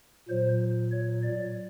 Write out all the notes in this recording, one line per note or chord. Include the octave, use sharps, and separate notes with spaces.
A#2 F#3 C5
C#5
D5